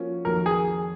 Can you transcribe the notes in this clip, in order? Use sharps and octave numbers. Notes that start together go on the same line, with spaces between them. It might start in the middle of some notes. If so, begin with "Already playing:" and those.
Already playing: F3 A#3 C#4 F#4
F2 D#3 F#3 A#3 A#4
G#4